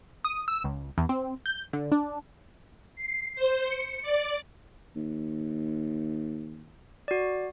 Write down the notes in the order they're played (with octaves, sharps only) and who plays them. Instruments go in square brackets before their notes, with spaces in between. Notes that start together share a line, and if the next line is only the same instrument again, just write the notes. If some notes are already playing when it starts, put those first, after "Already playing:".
[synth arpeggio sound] D#6
E6
C#2
E2
C4
G6
D3
D4
[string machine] C7
C5
C#7
D5
[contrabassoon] D#2
[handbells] F#4 D5